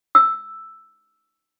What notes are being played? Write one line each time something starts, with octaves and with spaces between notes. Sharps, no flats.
E6